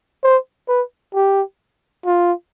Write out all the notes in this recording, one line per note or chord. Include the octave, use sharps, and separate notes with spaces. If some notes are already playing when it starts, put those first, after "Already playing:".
C5
B4
G4
F4